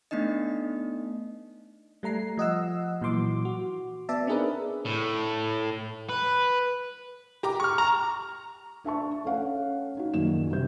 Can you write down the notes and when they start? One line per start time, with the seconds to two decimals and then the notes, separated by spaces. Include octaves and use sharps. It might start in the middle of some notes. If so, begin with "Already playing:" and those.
0.11 A3 B3 D4 D#4 D#5
2.03 G3 A3 A#5 C7
2.37 F3 D#5 F#5 E6
3.01 A#2 E3 F#3 C6 D6
3.45 F#4
4.09 B3 D5 E5 A5
4.27 C4 D4 D#4 G#4 A#4 B4
4.85 A2
6.09 B4
7.43 G4 A#5 D6
7.60 C#6 F6
7.78 A#5 C#6
8.84 D4 E5 A5 C#6
9.24 A3 C#4 F5 F#5
9.97 D#4 F#4
10.14 A#1 F#2 D#3 E7
10.51 G2 C3 G6